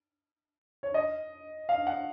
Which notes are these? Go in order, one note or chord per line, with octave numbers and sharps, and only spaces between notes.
C#5
D#5
F5
F#5